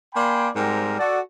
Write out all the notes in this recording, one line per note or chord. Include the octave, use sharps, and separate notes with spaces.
A#3 D5 G5 G#5 B5 C6
G#2 G3 C4 A#4
F#4 A4 D5